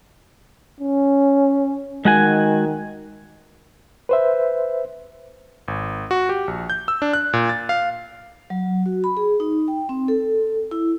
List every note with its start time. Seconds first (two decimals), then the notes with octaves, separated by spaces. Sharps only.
0.80 C#4
2.05 D#3 G#3 F#4 G#5
4.09 B4 C5 E5
5.68 G#1
6.11 F#4
6.29 G4
6.48 A#1
6.70 G6
6.88 E6
7.02 D4
7.13 F#6
7.33 A#2
7.49 A6
7.69 F5
8.50 F#3
8.86 F#4
9.04 B5
9.17 G#4
9.40 D#4
9.68 G5
9.89 C4
10.08 A4
10.71 E4